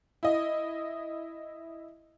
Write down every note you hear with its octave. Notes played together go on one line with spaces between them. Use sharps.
E4 D#5